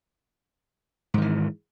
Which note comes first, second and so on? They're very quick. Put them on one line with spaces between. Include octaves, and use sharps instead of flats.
G#2 D#3 E3